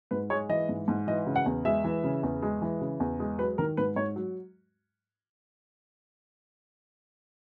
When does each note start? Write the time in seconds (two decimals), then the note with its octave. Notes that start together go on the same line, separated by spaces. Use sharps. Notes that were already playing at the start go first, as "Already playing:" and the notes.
0.11 G#2 B4
0.30 G#3 C#5
0.49 E3 D#5
0.69 G#2
0.88 G#2
1.07 E3 D#5
1.26 C#3
1.36 F#5
1.46 E2
1.65 G#3 E5
1.84 E3
2.04 C#3
2.23 E2
2.42 G#3
2.62 E3
2.81 C#3
3.00 E2
3.20 G#3
3.39 F#3 B4
3.58 D#3 A#4
3.77 G#2 B4
3.96 G#2 C#5
4.16 F#3